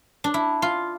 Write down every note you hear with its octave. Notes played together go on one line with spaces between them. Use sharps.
D4
E4
F4